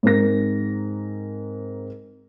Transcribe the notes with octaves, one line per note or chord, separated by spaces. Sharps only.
G#2 C4 A#4 A#6